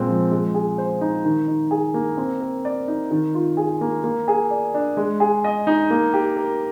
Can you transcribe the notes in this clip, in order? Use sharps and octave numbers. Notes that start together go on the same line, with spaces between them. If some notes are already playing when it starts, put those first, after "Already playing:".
Already playing: A#2 G#3 C4
F3
G#3
G#4
C5
D#4
D#3
D#4
G#4
A#3
C4
A#4
D5
D#4
D#3
F4
G#4
A#3
A#3
G#4
D5
D4
G#3
G#4
D#5
D#4
A#3
G4
A#4